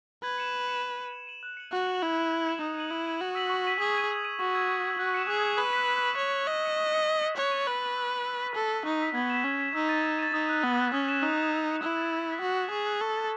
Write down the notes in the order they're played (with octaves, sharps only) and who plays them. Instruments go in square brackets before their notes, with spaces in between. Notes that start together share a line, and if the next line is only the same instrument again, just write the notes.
[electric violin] B4 [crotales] G#6
[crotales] C#7 E7
G#6
C#7 E7
G#6
D#7 F#7
G#6
D#7 F#7
F#6
C#7 F#7
[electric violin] F#4 [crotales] F#6
[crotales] C#7 F#7
[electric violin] E4 [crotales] G#6
[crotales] C#7 E7
G#6
C#7 E7
[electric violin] D#4 [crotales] D#6
[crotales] G#6 D#7 F#7
[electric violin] E4 [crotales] D#6
[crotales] G#6 D#7 F#7
[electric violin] F#4 [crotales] C#6
[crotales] E6 B6 D#7 F#7
C#6
E6 B6 D#7 F#7
[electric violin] G#4 [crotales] D#6
[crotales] G#6 D#7
D#6
G#6 D#7
[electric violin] F#4 [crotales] C#6
[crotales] E6 G#6
C#6
E6 G#6
[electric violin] F#4 [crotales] F#6
[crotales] C#7 E7
[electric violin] G#4 [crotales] F#6
[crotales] C#7 E7
[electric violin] B4 [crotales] G#6
[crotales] B6 F#7
G#6
B6 F#7
[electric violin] C#5 [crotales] G#6
[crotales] C#7 F#7
[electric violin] D#5 [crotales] G#6
[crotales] C#7 F#7
C#6
F#6 C#7
C#6
F#6 C#7
[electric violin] C#5 [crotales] F#6
[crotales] A6 D#7 F#7
[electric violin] B4 [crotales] F#6
[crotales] A6 D#7 F#7
E6
B6 D#7
E6
B6 D#7
[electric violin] A4 [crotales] C#6
[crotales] E6 B6
[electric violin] D#4 [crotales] C#6
[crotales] E6 B6
[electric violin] B3 [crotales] G#6
[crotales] B6 E7
[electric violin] C#4 [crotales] G#6
[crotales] B6 E7
[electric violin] D#4 [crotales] E6
[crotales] A6 D#7
E6
A6 D#7
[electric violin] D#4 [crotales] D#6
[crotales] F#6 A6
[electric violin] B3 [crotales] D#6
[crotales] F#6 A6
[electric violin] C#4 [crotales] D#6
[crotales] G#6 B6 E7
[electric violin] D#4 [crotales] D#6
[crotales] G#6 B6 E7
E6
A6 C#7
[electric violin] E4 [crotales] E6
[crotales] A6 C#7
E6
G#6 B6
[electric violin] F#4 [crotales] E6
[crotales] G#6 B6
[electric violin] G#4 [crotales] C#6
[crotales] F#6 A6 C#7
[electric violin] A4 [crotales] C#6
[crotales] F#6 A6 C#7